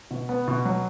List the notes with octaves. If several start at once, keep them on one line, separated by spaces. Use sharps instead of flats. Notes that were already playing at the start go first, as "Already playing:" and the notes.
B2
B3
B2
F#3